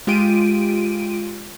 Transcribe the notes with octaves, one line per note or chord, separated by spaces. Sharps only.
G#3 F4 G4 D7 D#7